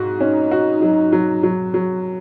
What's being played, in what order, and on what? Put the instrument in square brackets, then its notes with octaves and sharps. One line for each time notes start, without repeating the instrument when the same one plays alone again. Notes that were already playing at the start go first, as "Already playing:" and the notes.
Already playing: [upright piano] G#2 F#4
[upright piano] C#4 [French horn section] D#4
[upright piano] F#4
F#3
F#3
F#3
F#3